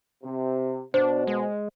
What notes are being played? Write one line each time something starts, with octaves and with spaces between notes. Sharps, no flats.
C3
B2 D4 C5
G#3